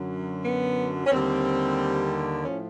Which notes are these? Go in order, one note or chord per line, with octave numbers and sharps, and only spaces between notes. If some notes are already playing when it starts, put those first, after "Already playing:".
Already playing: F#2 D3 F#3
B3
C#4
D#2 D3 G3 C4
A2 F3 C#4